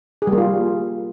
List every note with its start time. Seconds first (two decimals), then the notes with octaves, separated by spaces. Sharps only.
0.22 G#4
0.27 G3
0.32 A#3
0.38 F4